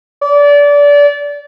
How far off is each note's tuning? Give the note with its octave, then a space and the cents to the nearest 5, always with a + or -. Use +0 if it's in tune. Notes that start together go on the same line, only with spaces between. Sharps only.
D5 -25